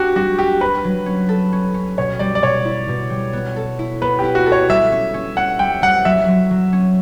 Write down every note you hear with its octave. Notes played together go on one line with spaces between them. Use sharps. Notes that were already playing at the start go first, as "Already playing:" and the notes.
Already playing: D4 F#4 G4
G3 F#4
F#4 G4
F#4 B4
F#3
C#4
A4
C#4
C#4
B2 C#5
G3 D5
D5
B2 C#5
E4
B2
G3
B3
A4
E4
B3 B4
G4
E4
F#4
A4
C#5
G3 E5
C#4
C#4
C#4 F#5
G3 G5
G3 F#5
F#3 E5
F#3
F#3
C#4